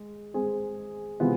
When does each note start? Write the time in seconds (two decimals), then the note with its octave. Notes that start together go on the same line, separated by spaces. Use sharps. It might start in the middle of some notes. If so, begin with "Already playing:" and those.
Already playing: G#3
0.34 G#3 C4 G#4
1.20 C3 E3 G#3 B3 F4